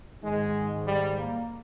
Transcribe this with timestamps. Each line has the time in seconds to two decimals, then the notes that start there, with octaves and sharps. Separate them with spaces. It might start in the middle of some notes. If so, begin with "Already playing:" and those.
0.22 G#2 D#3 G#3
0.86 G3
1.17 A#3